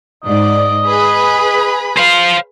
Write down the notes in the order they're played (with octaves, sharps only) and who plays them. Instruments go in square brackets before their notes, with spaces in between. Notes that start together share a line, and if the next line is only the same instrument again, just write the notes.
[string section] G#2 D5 [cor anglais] D#5
[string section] G#4 B4 B5
[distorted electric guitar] C5 F5